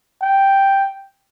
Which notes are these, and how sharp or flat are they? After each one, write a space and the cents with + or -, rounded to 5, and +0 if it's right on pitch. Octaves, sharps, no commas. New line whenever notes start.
G5 +0